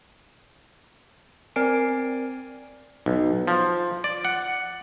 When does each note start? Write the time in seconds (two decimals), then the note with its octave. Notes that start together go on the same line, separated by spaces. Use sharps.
1.56 C4 A#4 D5 G#5 C7 D7
3.06 B1
3.47 F3
4.04 D5
4.25 F#5